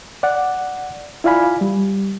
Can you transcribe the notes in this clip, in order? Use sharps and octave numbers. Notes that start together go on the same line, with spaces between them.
D5 F#5
E4 F4 D5 F5 G#5 B5
G3